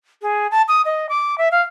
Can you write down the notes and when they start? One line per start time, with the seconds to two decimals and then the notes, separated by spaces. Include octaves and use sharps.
0.22 G#4
0.51 A5
0.68 D#6
0.85 D#5
1.09 D6
1.38 E5
1.51 F5